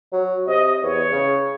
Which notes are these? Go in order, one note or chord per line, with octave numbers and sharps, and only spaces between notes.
F#3
C3 D#5
E2 C#5
C#3